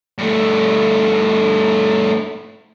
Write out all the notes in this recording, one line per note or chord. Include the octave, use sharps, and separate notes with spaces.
G2 A3